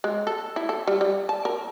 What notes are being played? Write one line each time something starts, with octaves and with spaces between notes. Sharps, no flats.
G#3
A4
E4
A4
G3
G3
A5
A#4